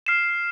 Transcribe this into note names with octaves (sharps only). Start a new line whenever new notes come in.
F6 C7 E7